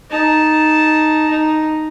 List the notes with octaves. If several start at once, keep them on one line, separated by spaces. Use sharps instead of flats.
D#4 A5
D#4